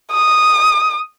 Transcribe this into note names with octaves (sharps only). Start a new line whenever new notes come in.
D#6